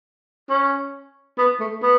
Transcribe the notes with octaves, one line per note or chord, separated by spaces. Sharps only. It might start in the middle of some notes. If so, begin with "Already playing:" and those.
C#4
B3
A3
B3